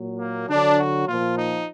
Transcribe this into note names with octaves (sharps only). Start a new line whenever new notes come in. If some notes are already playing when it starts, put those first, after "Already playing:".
Already playing: A#2 F#3
A#3
D3 F#3 D4
F#4
A#2 F3 F4
D#4